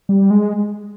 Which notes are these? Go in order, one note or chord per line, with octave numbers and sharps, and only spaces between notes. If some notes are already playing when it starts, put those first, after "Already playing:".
G3
G#3